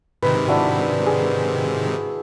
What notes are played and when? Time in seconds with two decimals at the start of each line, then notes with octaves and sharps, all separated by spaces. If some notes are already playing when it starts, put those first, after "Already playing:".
0.23 G#2 C3 D#3 B4
0.48 D4 E4 F#4
1.06 G#4